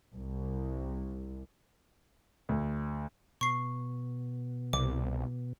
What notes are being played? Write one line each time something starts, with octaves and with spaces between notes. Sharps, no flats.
C2
D2
B2 C#6 C7
C2 D6